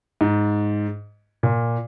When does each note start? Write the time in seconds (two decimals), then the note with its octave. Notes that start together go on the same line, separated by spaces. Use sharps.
0.21 G#2
1.43 A#2